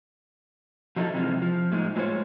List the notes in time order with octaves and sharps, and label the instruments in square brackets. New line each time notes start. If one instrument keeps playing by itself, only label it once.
[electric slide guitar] F3 F#3 D#4 E4 A4
C3 E3 F3 G#3
F3
A2 G#3 D#4
A2 F#3 G#3 F4 C5 C#5